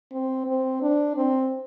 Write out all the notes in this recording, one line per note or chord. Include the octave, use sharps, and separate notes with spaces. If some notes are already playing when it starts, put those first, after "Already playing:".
C4
C4
D4
C4